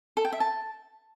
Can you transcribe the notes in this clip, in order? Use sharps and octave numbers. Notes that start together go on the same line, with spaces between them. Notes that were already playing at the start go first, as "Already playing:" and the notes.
A4
G5
E5
A5